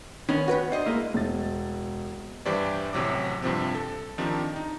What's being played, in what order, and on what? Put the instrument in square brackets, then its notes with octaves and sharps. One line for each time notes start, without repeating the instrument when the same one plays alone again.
[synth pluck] D#3 [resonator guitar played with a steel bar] B3 [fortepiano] C#4
[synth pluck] F#4 B4 G5
[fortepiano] D4 [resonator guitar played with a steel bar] C5 D#5
[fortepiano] G#3 A#3 E4
[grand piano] E1 A6
[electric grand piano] G2 E3 G4 C5 D5
A1 A2 C3 F#3 D6
G2 C3 F3 C4
A4
D#3 F3 C4 D4 D#4 G4
D#4